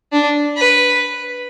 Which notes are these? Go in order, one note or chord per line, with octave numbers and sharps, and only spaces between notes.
D4
B4